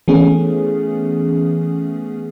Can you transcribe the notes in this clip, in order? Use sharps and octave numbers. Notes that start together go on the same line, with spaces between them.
E3 A3 B3 C#4 G#4